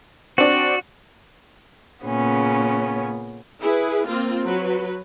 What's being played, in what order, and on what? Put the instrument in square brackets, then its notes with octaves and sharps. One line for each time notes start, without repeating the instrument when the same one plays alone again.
[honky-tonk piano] C4 D4 [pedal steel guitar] F#4
[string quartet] A#2 C#3 B3 C#4
[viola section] E4 G#4 B4
A#3 C4 F4
F#3 B4